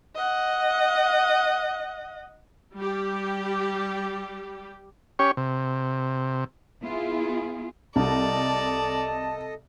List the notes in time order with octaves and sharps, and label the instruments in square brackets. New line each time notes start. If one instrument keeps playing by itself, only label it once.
[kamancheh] D#5 F#5
[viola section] G3 G4
[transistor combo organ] C#4 G4 C#5
C3
[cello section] B3 E4 F4 G#4
[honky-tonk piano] C2 [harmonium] A4 D#5 [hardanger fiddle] D5 [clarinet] A5